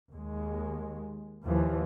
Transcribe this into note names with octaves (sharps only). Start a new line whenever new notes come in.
D#2 G#3
D#2 E3 F3